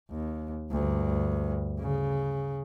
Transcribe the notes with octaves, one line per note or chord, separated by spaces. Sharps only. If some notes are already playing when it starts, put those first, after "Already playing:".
D#2
D2 G2
C#3